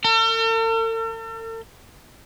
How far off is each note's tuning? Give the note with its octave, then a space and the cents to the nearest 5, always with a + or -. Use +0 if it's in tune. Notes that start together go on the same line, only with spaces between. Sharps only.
A4 +45